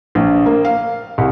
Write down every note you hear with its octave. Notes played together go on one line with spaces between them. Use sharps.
A#1
A#3
F5
C2